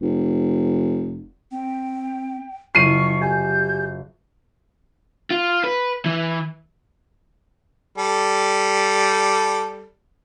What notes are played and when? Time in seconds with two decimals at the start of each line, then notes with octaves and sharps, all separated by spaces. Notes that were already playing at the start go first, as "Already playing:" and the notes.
0.02 F1
1.51 C4 G5
2.75 F#1 E4 F4 C#6 C7 D#7
3.21 G4 G#5 G6
5.31 F4
5.64 B4
6.06 E3
7.98 G3 A4